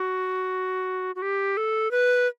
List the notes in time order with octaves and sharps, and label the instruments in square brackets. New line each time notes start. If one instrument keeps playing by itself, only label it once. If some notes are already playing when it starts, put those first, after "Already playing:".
Already playing: [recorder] F#4
F#4
G4
A4
B4